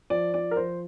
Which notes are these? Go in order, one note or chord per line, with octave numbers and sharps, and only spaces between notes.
F3 D5
F3 D5
A#4
F3 C5